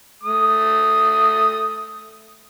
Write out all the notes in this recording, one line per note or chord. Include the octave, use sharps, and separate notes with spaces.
A3 D#6